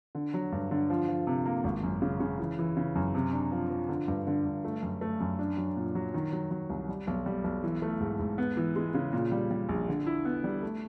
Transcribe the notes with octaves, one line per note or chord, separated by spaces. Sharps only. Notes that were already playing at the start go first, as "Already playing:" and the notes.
D3
F#3
G2
D3
F3
F3
C3
A#3
G#1
F#2
C#3
C#3
E3
E3
C#3
F#2
C3
D4
F3
F3
D3
G2
D3
G2
A3
F#2
A3
F#2
D4
F#3
A#2
F#3
D#3
F#3
F#3
C2
G3
B1
G3
B1
E3
A3
G#2
G#2
B3
E3
G#3
C#3
A#2
G3
G3
A#1
D3
E4
B3
G3
A3